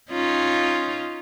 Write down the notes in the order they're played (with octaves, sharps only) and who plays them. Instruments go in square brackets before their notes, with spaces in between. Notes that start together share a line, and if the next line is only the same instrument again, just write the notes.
[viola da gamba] C#4 D#4 F4